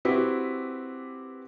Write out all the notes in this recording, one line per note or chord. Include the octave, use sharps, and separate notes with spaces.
C4 E4 F#4 G4 B4